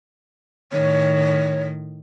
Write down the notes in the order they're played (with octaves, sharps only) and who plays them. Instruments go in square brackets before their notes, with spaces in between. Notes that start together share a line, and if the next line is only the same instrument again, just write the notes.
[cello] A2 D#3 [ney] C#5